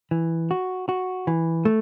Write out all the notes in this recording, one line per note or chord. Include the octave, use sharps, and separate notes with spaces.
E3
F#4
F#4
E3
A3